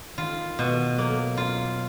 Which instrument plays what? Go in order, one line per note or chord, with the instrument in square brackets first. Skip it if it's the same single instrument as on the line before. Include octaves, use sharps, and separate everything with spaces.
[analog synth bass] D#3 [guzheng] F4
[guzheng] B2
[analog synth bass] F#3 [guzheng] A#3
[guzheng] F4